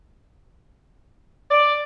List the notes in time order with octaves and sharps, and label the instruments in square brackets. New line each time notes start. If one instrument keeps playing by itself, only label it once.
[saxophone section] D5